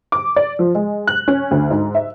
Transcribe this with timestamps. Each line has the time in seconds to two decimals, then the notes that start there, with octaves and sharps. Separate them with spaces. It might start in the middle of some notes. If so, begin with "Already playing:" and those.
0.12 D6
0.36 D5
0.59 F3
0.75 G#3
1.07 F#6
1.28 C#4
1.51 D2
1.70 G#2
1.95 E5